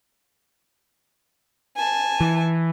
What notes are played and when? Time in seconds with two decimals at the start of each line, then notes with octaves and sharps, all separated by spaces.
1.76 G#5 A5
2.21 E3